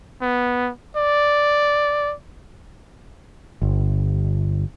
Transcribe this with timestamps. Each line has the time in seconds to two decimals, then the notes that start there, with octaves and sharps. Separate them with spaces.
0.21 B3
0.97 D5
3.62 G1